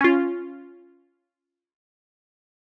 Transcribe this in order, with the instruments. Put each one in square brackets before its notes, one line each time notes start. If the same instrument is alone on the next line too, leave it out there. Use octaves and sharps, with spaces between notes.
[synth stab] C#4 F4